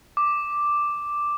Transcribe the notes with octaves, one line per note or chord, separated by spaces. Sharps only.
D6